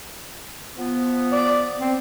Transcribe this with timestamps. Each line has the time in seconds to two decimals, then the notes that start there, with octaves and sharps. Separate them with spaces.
0.78 F3 B3
1.32 D5
1.80 C4